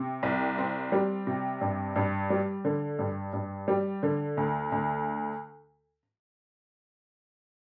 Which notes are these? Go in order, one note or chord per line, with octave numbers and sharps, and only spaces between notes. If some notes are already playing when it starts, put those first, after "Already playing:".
Already playing: C3
C2
C4
G3
C3
G2
G2
G3
D3
G2
G2
G3
D3
D2
D2